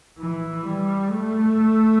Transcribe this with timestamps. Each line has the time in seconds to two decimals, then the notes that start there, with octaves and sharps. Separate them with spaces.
0.19 E3
0.66 G3
1.10 A3